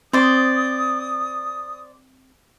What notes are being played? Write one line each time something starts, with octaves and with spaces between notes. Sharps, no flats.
C4 C5 D5 C6 D#6